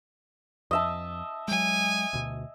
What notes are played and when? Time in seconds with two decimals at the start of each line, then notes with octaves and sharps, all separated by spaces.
0.71 F2 D#5 E5 A5
1.48 F#3 G#3 G#5
2.13 D2 B2